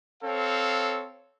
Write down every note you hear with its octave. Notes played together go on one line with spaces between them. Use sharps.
C4 A4 C#5 F5